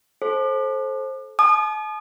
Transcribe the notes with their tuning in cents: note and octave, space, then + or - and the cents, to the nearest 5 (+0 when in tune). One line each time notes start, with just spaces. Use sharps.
A4 -25 C5 +20
A5 -45 D#6 -40